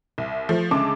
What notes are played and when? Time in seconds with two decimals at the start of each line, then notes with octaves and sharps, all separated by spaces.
0.18 C2
0.49 F3 A3
0.71 D2 C#3 G#3 A5 D6